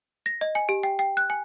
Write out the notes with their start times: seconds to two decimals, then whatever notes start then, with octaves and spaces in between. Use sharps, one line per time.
0.26 A#6
0.41 D#5
0.55 G#5
0.69 G4
0.83 G5
0.99 G5
1.17 F#6
1.30 G#5